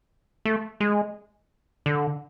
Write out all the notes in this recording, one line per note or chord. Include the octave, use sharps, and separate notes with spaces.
A3
G#3
D3